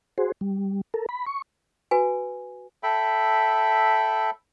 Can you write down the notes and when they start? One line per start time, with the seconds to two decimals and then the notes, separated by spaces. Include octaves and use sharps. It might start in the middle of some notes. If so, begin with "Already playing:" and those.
0.18 F#4 G#4 C5
0.41 G3
0.94 A4 A#4
1.09 B5
1.26 C#6
1.91 F#4 B4 G#5
2.83 A4 E5 G5 B5